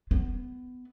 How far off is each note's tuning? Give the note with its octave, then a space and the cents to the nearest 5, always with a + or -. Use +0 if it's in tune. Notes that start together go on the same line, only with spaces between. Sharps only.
B3 +20